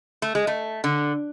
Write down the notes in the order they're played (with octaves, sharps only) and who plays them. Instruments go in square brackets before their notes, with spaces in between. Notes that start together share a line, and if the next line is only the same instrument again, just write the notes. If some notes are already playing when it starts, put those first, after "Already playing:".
[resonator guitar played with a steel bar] A3
G#3
A3
D3